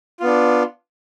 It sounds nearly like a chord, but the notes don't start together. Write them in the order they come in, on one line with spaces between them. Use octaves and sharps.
F4 B3 D4